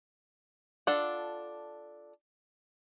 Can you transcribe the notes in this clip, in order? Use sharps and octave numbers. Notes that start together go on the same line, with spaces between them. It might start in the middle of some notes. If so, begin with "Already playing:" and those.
D4 F4 A4 F#5